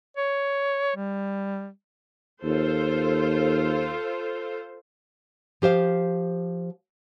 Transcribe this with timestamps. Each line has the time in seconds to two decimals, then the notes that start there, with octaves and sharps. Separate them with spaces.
0.17 C#5
0.96 G3
2.43 D#2 F4 A4 C5
5.62 F3 G4 C5 F5